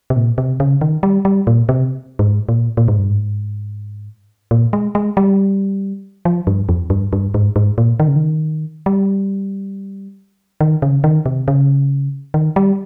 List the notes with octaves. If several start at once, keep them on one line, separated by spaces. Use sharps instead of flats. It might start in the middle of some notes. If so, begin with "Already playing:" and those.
C3
A#2
C3
C#3
D#3
G3
G3
A#2
C3
G#2
A#2
A#2
G#2
G2
G#2
A#2
G#3
G#3
G3
F3
G2
F2
G2
G2
G#2
G#2
A#2
D#3
C#3
D#3
G3
D#3
C#3
D#3
C3
C#3
D#3
G3